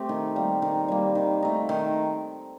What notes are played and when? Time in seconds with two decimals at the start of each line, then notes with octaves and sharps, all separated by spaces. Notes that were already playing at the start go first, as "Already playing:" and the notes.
Already playing: A3 C4 G4
0.09 D#3
0.36 G3 A#3
0.62 D#3
0.88 G3 A#3
1.15 D#3
1.42 A3 D#4
1.69 D#3